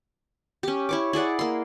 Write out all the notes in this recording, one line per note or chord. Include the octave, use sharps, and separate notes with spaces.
C#4 G4
E4 C#5 D6
E4 G#4 D5 F#5
A#3 C6